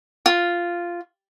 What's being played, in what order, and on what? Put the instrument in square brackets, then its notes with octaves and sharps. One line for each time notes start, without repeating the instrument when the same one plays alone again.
[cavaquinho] F4